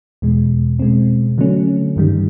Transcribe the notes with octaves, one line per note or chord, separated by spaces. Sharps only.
E2 B2 G#3
B2 G#3 C4
D3 F#3 A3 C#4
G2 D#3 G3